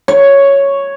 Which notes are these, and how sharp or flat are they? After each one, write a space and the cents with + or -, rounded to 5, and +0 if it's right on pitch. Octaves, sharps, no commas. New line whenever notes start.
C#5 +0